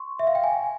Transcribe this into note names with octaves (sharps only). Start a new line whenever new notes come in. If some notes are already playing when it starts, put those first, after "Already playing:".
Already playing: C6 C#6
E5
F5
G5
G#5